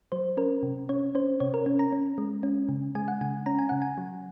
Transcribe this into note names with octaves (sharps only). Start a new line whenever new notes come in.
F#3 C5
C#4 A#4
C3
C#4 C#5
C#4 C5
C3 C#5
A#4
C#4
A#5
C#4
G#3
C#4
C#3
G#3 G#5
F#5
C#3 G#5
C#4 A#5
G#5
C#3 F#5
G#5
F#3